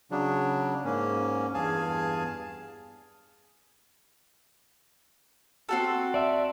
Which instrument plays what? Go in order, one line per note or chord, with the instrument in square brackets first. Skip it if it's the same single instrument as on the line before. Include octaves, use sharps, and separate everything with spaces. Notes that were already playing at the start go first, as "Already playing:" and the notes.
[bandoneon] C#3 F#3 D4
G#2 A#3 C#4
E2 G2 G#4 F5 G#5 A5
[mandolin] C4 F#4 A4
[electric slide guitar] D5 E5